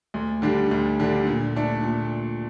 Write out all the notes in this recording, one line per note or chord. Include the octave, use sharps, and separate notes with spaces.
D2
D3 G3 D4
D2
D3 G3 D4
A#2
A3 D4
A#2